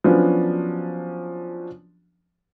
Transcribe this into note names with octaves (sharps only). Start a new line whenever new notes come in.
F3 F#3 B3 C#4 D4 F#4